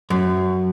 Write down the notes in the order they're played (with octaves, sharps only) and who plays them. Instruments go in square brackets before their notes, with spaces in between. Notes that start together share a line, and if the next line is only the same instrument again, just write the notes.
[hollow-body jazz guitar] F#2